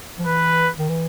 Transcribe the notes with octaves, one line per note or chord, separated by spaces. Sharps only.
F3
E3 B4
D#3
E3